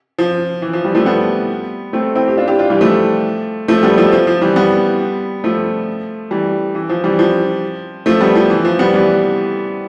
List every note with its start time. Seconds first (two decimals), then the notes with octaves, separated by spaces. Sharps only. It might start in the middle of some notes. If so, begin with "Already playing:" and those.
0.18 F3
0.62 E3
0.73 F3
0.84 E3 G3
0.95 F3 A3
1.06 G3 B3
1.93 A3 C4
2.15 C4 E4
2.28 G4
2.37 D4 F4
2.48 E4 G4
2.59 D4 F4
2.70 E3 G3
2.81 F3 A3
3.68 F3 A3
3.83 G3 B3
3.98 F3 A3
4.12 F3
4.27 F3
4.42 E3 G3
4.56 G3 B3
5.44 F3 A3
6.31 E3 G3
6.75 E3
6.89 F3
7.04 E3 G3
7.19 F3
8.06 F3 A3
8.21 G3 B3
8.35 F3
8.50 E3
8.65 F3
8.79 G3 B3
8.94 E3 G3